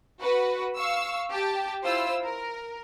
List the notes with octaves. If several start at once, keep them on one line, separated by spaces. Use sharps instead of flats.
F#4 B4
F5 C#6 E6
G4 G5 A5
E4 F4 C5 E6
A#4